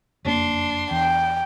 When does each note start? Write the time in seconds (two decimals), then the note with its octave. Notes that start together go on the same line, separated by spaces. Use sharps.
0.25 F#1 F2 A#3 D4 C6
0.91 E2 G5